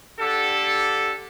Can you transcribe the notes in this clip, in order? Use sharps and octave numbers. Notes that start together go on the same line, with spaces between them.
D3 G4 A4